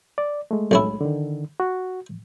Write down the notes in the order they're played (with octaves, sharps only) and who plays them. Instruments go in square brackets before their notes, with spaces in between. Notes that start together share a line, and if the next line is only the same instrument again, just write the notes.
[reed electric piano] D5
G#3 A3
[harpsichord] B1 C#4 E4
[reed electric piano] D3 D#3
F#4